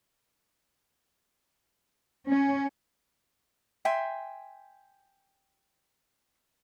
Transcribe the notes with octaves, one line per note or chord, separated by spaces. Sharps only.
C#4
E5 G5 G#5 C6